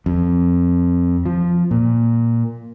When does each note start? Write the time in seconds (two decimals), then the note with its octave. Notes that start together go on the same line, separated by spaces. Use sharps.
0.06 F2
1.26 F3
1.71 A#2